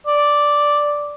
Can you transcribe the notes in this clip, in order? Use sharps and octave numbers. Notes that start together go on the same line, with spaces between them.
D5